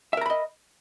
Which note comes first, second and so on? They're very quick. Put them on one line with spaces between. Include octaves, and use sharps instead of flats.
E5 A#4 A#5 B5 D#5